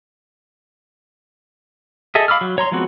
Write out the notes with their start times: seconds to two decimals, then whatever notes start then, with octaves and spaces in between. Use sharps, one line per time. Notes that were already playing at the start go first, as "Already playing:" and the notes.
2.15 G#4 A4 D#5 E5
2.28 F5 B5 D6 E6 F6
2.41 F#3
2.58 C#5 A#5 C6
2.72 F3 G#3 B3 C4 F#4